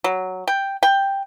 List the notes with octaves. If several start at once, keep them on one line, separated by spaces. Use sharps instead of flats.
F#3
G5
G5